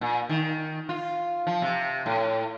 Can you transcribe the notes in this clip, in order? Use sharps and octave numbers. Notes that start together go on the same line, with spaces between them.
A#2
D#3
F4
F3
C3
A2